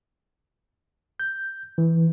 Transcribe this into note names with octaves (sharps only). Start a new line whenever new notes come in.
G6
E3